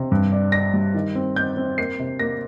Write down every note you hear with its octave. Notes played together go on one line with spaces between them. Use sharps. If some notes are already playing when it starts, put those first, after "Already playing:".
Already playing: C3
G2
D4
D4 A#6
G3
D#3
C4
C4 G6
C4
A#3 C7
C3
A#3 A#6